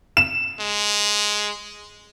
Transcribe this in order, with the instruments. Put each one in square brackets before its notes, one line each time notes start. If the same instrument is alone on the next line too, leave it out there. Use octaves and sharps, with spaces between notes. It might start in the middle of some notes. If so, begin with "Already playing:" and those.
[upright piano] E7
[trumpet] G#3